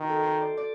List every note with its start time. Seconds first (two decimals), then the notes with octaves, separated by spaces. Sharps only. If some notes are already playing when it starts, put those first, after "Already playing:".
Already playing: D#3 F#4
0.09 A4
0.25 C5
0.41 D5
0.57 D5